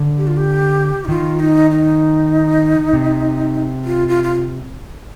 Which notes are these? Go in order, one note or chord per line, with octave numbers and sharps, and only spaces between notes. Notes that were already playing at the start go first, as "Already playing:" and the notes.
Already playing: D3
G4
F4
G4
D#4
D#3 F4
D#4
D#4
C3
F4
F4
F4